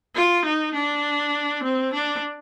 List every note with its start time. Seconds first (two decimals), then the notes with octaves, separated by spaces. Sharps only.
0.15 F4
0.45 D#4
0.74 D4
1.63 C4
1.93 D4